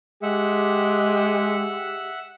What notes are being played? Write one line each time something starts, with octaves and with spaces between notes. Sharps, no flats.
G#3 G4 E5 F#5